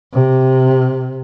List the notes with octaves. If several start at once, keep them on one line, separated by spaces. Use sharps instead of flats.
C3